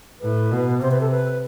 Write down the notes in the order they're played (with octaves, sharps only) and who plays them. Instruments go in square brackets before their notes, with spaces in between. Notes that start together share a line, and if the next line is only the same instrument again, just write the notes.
[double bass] A2 [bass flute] B4
[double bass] B2
[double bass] C3 [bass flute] C5
[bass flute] B4
A4
B4